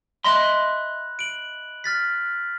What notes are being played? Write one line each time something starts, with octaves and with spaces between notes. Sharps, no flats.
D#5 E5 B5 C6 F#6
D7 F#7
F6 A6 B6